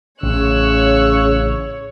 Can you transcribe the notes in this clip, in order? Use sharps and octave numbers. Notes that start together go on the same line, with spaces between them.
A1 C#3 C#5 E6 F#6